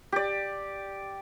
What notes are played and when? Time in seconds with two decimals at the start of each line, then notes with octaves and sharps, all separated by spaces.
0.12 G4 D5